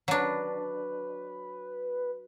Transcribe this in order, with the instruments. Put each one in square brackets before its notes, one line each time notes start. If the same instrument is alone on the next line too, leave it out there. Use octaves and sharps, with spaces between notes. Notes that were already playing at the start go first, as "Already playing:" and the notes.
[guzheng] F#3 D4 [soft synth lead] B4